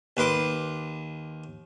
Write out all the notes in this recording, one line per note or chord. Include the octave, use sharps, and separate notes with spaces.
D#2 B4 C6 D6